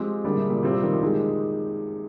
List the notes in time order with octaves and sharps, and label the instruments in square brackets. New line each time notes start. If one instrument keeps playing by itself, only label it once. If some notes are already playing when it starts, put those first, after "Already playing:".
Already playing: [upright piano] F3 [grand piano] G#3 C4 G4
[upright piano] D3 [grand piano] G3 A#3 D4 G#4
[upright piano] C3
A#2
[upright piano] C3 [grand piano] G3 C4 F4
[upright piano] A#2
D#3
F3
[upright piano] G3 [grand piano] G#3 D#4 G#4